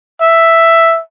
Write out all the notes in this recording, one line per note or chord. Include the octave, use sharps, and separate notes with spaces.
E5